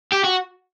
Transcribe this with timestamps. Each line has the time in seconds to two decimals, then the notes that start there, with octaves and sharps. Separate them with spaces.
0.13 G4
0.24 F#4